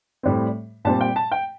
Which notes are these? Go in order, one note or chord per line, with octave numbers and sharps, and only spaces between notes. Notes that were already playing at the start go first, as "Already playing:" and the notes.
A2 G3 C4
A#2 G3 C4 A5
G5
A5
G5